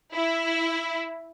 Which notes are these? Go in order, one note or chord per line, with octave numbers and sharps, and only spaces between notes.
E4